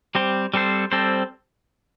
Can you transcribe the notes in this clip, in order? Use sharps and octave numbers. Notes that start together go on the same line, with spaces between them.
G3 C4 G4 C5
G3 C4 A4 C5
G3 C4 A4 C5